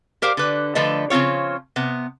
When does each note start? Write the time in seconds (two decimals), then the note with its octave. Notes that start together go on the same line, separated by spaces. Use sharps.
0.22 G4 A#4 C5 F5
0.37 D3 B4
0.75 D3 F3 A3 B4 D#5
1.10 C#3 F3 C4 F4 C#5
1.76 C3 B3